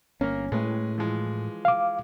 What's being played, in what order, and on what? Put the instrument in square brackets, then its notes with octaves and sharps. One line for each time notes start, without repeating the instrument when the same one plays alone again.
[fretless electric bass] G1 C#4 [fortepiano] A#3 A#4
[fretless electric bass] A2 [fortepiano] G#3 C#4 B4
[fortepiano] E3 F3 G#3
[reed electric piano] F5 D6